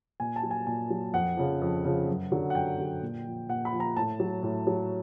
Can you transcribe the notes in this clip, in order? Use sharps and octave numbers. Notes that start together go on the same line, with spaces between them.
A#2 G#5
A5
F#3
G#5
A#2 G#5
F#3
F2 F#5
C#3 F3
F2
C#3 F3
F#2
D3 F#3
F#5
F#2 G5
D3 F#3
A#2
F3
A#2 F#5
B5
F3
A#5
A2 A5
F#3
A2
F#3